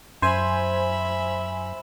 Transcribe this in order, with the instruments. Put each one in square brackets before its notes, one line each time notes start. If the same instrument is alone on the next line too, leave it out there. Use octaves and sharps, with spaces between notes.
[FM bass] F#2 [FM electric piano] C5 G#5 [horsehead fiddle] E5 B5